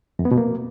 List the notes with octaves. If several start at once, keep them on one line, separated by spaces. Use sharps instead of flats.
F2
B3
B2
A#3